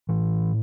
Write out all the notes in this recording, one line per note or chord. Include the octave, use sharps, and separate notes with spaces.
A2 E3